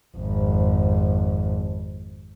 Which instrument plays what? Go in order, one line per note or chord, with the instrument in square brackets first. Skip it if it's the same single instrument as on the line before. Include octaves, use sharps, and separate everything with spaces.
[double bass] G#1 F2